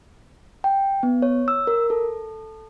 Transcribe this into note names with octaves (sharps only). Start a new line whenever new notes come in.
G5
B3
C#5
E6
A#4
A4